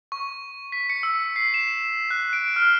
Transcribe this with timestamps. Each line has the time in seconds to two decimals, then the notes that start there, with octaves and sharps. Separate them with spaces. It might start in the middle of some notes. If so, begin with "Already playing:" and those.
0.12 C#6
0.72 B6
0.90 C#7
1.03 E6
1.36 C7
1.54 E7
2.11 F#6
2.33 D7
2.56 F6